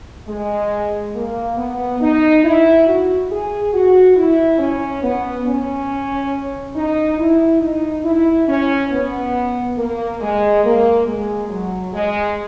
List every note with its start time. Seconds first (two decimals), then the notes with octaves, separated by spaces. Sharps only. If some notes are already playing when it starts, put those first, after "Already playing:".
0.27 G#3
1.14 A#3
1.57 B3
2.00 D#4
2.44 E4
2.87 F#4
3.30 G#4
3.72 F#4
4.16 E4
4.59 C#4
5.02 B3
5.46 C#4
6.75 D#4
7.18 E4
7.61 D#4
8.05 E4
8.47 C#4
8.91 B3
9.77 A#3
10.20 G#3
10.64 A#3
11.06 G#3
11.49 F#3
11.92 G#3